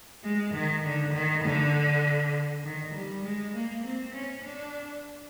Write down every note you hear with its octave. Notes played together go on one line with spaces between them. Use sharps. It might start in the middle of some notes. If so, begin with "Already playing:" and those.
G#3
D#3
D3
D#3
D3
D#3
G3
G#3
A#3
C4
C#4
D4